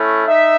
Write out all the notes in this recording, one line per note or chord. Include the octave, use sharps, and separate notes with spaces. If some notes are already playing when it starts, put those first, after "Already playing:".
Already playing: A3 C#4 E4
D#4 E5